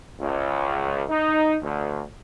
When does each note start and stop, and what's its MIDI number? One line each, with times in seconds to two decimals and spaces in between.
0.20 1.02 37
1.09 1.55 63
1.61 2.01 38